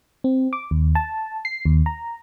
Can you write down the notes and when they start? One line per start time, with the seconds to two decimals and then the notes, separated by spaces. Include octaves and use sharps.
0.24 C4
0.53 D6
0.71 D#2
0.95 A5
1.45 C7
1.65 D#2
1.86 A#5